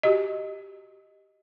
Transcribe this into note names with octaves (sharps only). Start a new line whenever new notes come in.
F#4 G4 D#5